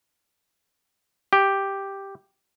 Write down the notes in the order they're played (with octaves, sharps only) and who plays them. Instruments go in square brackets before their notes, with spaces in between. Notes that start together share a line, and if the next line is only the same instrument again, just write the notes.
[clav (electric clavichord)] G4